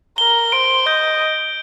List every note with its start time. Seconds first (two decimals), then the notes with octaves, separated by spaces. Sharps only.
0.18 A#4 G7
0.52 C5 D7
0.86 D#5 G6